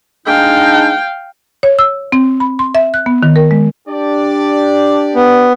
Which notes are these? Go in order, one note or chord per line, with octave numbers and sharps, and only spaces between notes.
G#3 D4 D#4 F5 G5
C#5
E6
C4
B5
C6
E5
F#6
B3
D#3
A#4
G#3
D4 G4 D5
B3